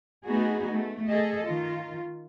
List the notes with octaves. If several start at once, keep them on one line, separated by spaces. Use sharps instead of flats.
A3 B3 D#4 F#4 G#4
A3
G#4 A4 D#5
D#3 F4